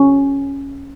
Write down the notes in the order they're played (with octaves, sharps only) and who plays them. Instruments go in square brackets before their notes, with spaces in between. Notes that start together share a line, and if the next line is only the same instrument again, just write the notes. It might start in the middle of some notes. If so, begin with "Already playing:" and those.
Already playing: [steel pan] C#4